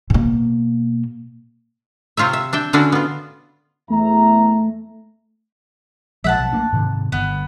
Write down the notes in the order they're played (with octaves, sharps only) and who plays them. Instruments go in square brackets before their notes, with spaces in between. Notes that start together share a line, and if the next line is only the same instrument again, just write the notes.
[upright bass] B2 A#3
[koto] C3 C4 F4 C#5 E5
E5
D4 E5 G5
D3 C#4 D4 E4 F#4
B3 F4
[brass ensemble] E2 E5 A#5 [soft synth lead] A3
[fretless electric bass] A#1 F3 G#3 [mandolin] E5 F#5 A5
[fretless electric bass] B1
A3 A#3 D4
G#2 C3 D#3
[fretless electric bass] G1 [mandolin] B3